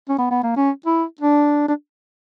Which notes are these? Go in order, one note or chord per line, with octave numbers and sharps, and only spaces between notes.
C#4
B3
B3
A#3
C#4
E4
D4
D4